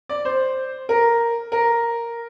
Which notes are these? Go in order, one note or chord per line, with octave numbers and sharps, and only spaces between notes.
D5
C5
A#4
A#4